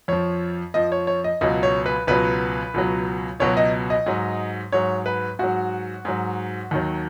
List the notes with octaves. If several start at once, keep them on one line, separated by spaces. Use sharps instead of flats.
F2 F3 C#5
F2 F3 D#5
C#5
C#5
D#5
C#2 B2 F#3 D#5
C#5
B4
C#2 B2 F#3 B4
C#2 B2 F#3
C#2 B2 F#3 C#5
D#5
D#5
G#2 F#3
G#2 F#3 C#5
B4
G#2 F#3 F#4
G#2 F#3
D#2 D#3 F#3